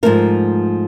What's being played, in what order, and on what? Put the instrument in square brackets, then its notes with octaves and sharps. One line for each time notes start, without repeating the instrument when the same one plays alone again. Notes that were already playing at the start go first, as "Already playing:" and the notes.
[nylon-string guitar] G#2 F3 A3 A#4